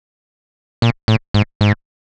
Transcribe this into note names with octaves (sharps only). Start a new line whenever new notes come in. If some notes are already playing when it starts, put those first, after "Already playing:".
A#2
A2
G#2
G#2